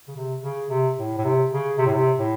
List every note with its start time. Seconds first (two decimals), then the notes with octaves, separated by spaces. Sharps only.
0.08 C#3
0.16 C3
0.42 C#3
0.70 C3
0.97 A2
1.17 A2
1.24 C3
1.51 C#3
1.78 C3
1.86 A2
1.94 C3
2.19 A2